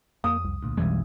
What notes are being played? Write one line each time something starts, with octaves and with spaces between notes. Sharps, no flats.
F2 A#3 D#6
C2
D2 A#2
B1 F2 E3 G3 G#3